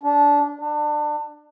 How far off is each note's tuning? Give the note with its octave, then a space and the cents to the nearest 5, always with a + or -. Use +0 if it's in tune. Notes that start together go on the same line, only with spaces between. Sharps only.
D4 -20
D4 +25